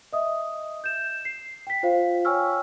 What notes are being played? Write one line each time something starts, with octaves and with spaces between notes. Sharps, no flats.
D#5 E5 D#6
G6 E7
C7
G5 B6
F4 C5 F5
C#5 G5 G#5 C#6 E6 F6